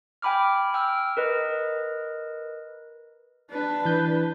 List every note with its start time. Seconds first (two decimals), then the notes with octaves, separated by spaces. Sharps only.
0.22 G5 G#5 B5 D6 F6
0.74 G5 E6 F6
1.17 A#4 B4 D#5
3.50 D4 B4
3.85 E3 G6